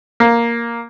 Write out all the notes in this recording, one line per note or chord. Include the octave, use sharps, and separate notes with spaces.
A#3